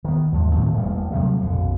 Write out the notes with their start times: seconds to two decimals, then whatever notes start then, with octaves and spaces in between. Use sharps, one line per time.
0.05 D#3 B3
0.32 D#2 G#2 F3
0.54 A2 D#3 A3 C4
0.73 E1 A1 G3 A#3
1.11 C3 F#3 G3 A3
1.41 A#1 F2 B2 D3